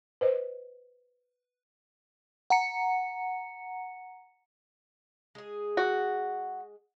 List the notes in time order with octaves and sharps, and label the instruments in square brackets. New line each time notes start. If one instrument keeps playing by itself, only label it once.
[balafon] B4 C5 D#5
[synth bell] F#5 A#5 C#7
[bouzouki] G#3 G#4
[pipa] F#4